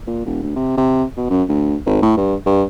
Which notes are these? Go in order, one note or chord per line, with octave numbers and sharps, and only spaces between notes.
A#2
E1
D2
C3
C3
B2
F#2
D2
G#1
A2
G2
G2